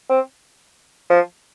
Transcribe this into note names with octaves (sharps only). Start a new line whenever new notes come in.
C4
F3